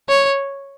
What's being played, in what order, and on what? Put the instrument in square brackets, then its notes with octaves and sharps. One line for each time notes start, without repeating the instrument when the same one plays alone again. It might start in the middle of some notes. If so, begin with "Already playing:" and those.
[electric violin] C#5